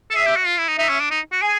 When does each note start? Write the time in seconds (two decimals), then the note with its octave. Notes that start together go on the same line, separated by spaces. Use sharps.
0.11 A4
0.15 G#4 E5
0.26 G4
0.37 F#4
0.47 F4
0.57 E4
0.68 D#4
0.79 D#4 E5
0.89 C#4
1.00 D4
1.11 D#4
1.32 F#4
1.42 G#4 G#5